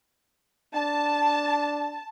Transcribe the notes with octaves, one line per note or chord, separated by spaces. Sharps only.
D4 A5